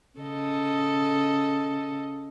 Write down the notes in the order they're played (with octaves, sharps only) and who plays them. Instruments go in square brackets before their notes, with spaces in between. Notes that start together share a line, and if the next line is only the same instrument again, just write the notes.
[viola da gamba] C#3 A4 D#5